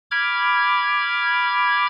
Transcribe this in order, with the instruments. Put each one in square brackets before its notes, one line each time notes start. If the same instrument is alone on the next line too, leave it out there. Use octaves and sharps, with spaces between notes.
[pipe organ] B5 D6 F6 G#6